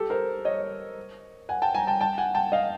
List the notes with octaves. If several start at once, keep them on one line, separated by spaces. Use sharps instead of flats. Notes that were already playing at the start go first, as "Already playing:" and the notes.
Already playing: G4 A4
A#4 C5
C#5 D#5
F#5 G#5
G5 A5
G#5 A#5
G5 A5
G5 A5
F#5 G#5
G5 A5
D#5 F5